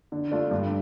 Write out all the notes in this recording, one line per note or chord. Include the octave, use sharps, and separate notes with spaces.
D3
A3 D4 F4
G2